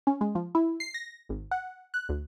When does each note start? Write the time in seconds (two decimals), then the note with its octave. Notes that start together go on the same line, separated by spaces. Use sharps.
0.07 C#4
0.21 G#3
0.35 F3
0.55 E4
0.80 C7
0.94 A#6
1.29 G#1
1.51 F#5
1.94 F#6
2.09 D2